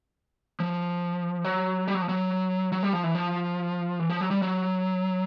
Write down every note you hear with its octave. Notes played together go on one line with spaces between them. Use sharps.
F3
F#3
G3
F#3
F3
F#3
F#3
G3
F3
E3
F3
E3
F3
F#3
G3
F#3